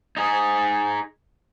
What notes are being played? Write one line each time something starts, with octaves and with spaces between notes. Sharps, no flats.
D#4 G#4